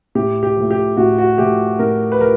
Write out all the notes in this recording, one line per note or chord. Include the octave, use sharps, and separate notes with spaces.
A2 G4
G4
F3 A3
G4
A2 F#4
F#4
F3 A3 G4
A2 A#4
B4
F3 A#4